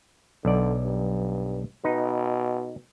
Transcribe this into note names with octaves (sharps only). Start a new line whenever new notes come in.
B1 D3 D5
G2
B2 D#4 B4